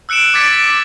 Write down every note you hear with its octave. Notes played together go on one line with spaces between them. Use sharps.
E6 F#6 C#7 D7 E7
D6 G#6 A6 B6 C#7 D7
D6 A6 D7
D6 B6